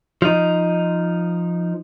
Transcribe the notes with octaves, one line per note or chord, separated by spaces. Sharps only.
F3 D#4